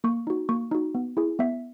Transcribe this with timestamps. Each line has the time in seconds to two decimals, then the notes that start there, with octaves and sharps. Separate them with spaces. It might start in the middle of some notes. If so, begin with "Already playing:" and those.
0.04 A#3 C#6
0.27 D#4 F#4
0.49 A#3 C#6
0.71 D#4 F#4
0.95 B3
1.17 E4 G#4
1.39 B3 E5